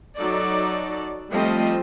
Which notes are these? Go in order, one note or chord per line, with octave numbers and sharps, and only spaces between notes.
F#3 D#4 A4 D5
F3 G3 A3 C4 D#5